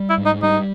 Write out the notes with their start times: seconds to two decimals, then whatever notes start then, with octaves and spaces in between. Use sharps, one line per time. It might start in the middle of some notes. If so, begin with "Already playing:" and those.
Already playing: G3
0.09 E4
0.18 G#2
0.26 D#4
0.42 G3 D#4